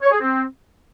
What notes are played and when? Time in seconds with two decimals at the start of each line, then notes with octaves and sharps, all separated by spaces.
0.03 C#5
0.11 G#4
0.20 C4